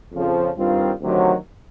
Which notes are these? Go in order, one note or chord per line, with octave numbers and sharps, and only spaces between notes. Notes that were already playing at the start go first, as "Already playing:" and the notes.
F2 C#3 F3
G2 D#3 G3 C4 F4
D2 C3 D#3 F#3